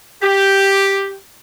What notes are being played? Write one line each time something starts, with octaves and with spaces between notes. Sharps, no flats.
G4